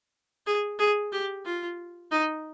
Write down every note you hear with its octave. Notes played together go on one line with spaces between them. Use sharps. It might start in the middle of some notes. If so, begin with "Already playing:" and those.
G#4
G#4
G4
F4
D#4